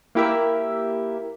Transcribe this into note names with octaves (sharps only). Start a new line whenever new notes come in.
A#3 E4 G4 A#4 E5